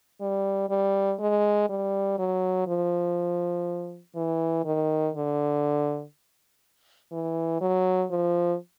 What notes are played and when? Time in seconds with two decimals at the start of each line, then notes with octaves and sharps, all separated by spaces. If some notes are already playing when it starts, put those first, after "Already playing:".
0.21 G3
0.70 G3
1.20 G#3
1.69 G3
2.18 F#3
2.67 F3
4.15 E3
4.65 D#3
5.14 D3
7.12 E3
7.61 F#3
8.11 F3